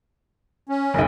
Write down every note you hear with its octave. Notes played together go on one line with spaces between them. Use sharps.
C#4
F#1 B1